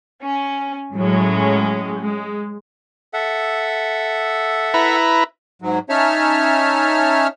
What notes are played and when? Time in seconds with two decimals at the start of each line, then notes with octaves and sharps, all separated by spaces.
0.22 C#4
0.93 A2 F#3 G#3 C#4
2.01 G#3
3.14 A4 E5 F#5
4.74 E4 B4 A#5
5.62 G#2 F#3
5.89 C#4 D#4 C#5 E5 A5 F6